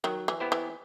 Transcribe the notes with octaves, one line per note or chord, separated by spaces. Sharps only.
D#3 F#3
E3
B3 E4 G4 C5
E3